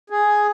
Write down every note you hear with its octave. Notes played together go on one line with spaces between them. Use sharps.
G#4